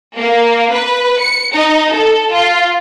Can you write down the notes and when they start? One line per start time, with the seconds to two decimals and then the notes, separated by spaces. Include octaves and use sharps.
0.17 A#3
0.73 B4
1.21 C#7
1.55 D#4
1.94 A4
2.33 F4